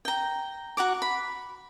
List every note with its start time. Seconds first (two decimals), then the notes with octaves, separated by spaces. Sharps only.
0.05 G5 A#5
0.77 F#4 F#5 A#5 D6
1.02 B5